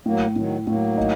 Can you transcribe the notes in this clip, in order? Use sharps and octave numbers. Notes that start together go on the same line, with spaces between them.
A2 F#3 A#3
A2 D#3 F#3
A2 F#3 A#3
D#4